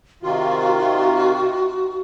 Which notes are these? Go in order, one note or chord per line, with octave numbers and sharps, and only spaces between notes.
C3 D#3 F4 F#4